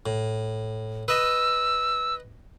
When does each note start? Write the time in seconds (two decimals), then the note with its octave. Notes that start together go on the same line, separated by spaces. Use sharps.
0.06 A2
1.08 B4 D#5 E6